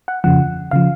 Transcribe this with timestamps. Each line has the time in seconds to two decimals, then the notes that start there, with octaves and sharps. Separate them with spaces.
0.08 F#5
0.24 F2 C#3 F3 F#5
0.71 C#3 F3 F5